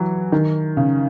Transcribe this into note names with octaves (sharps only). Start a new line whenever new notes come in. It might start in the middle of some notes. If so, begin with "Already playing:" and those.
Already playing: E3 F#3
D#3
C#3